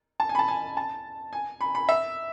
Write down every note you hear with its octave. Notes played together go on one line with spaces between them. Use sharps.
A5
G#5
B5
A5
G#5
A5
G#5
B5
B5
E5